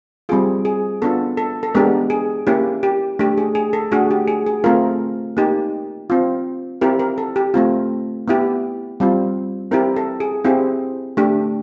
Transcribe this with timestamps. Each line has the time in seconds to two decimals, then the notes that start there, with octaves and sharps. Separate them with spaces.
0.29 G3 C4 F4 G#4
0.65 G#4
1.02 B3 D4 F4 A4
1.37 A4
1.63 A4
1.75 G#3 B3 D4 G4 A#4
2.10 G#4
2.47 A#3 C#4 E4 G4
2.83 G4
3.19 A3 D4 G4
3.38 G#4
3.55 G#4
3.73 A4
3.91 A3 D4 F#4 G#4
4.11 G4
4.28 G#4
4.46 G#4
4.64 A3 C4 F4 A#4
5.37 A#3 D#4 G4
6.10 C4 F4
6.81 C4 E4 G4 A#4
7.00 A#4
7.18 A4
7.36 G4
7.54 A3 C4 F4
8.28 B3 E4 G4
9.00 G3 C4 F4
9.72 C4 E4 G4 A#4
9.96 A4
10.20 G#4
10.44 C4 E4 G4 G#4
11.17 A3 D4 G4